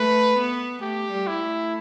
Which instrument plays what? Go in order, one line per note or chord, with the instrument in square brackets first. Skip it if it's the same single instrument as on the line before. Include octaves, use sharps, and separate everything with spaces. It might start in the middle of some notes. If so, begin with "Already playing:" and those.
Already playing: [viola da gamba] A3 [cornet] B4
[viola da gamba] B3
[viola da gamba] A3 [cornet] G4
[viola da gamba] G3
[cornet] E4
[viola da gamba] A3